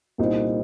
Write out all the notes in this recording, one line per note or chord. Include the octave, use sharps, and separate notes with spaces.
C2 A#2 G3 C4 D#4